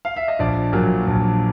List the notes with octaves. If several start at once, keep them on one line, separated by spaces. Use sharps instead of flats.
F5
E5
D#5
A#1 D5
A#2 F#3 A#3
A#1